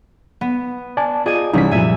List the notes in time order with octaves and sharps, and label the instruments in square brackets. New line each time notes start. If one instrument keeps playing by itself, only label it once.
[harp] B3
[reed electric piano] D5 G#5 A5
[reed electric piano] F4 D5 D#5 [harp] G#4 G#5
[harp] C2 B6 [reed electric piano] E3 C#4 D#4
[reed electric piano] F#2 A#2 F3 [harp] E5 G#5